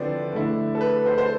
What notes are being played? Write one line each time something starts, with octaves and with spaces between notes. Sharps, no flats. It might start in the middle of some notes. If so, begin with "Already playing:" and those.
Already playing: D3 F3 C4 E4 B4 D5
D3 A3 E4
A4
B4
C5
C5